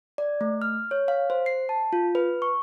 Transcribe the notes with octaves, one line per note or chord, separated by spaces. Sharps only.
D5
A3
F6
C#5
F5
C5
C7
A5
F4
B4
C#6